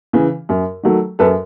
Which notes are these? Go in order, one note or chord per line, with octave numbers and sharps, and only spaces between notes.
C#3 E3
F#2
D#3 F#3 A3
F#2 A4 B4